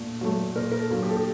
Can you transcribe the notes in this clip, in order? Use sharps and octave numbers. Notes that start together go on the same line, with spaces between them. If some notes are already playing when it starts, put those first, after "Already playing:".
Already playing: A#2 A3
F#3 A3
A#2 A#4
A#4
A4
F#3 A#3
G4
A4
G4